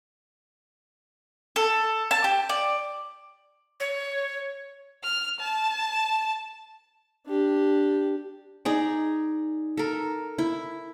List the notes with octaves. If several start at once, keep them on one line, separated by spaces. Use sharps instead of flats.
A4
A5
G4
D5
C#5
F6
A5
D4 G4
D#4 G#4 D5
A4 A#4
E4